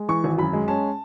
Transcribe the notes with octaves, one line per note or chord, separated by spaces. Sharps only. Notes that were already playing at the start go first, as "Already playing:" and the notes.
Already playing: G#3
E3 C#6
G#1
F#2 B5
G#3
C#4 A5